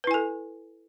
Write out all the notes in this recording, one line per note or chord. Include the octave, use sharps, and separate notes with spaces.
E4 A4 B4 G#5